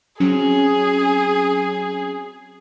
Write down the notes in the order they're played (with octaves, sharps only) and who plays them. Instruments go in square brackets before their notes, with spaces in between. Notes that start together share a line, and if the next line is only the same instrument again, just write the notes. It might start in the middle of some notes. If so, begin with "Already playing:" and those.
[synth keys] F#3 C4 C#4 [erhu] G#4